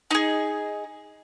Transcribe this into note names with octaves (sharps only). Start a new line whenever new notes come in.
D#4 G#4